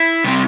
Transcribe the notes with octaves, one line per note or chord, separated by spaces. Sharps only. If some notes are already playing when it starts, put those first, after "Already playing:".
Already playing: E4
C3 G3 C4